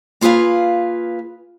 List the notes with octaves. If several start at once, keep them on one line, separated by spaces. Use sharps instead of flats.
A#3 F4 G#4 B4 F5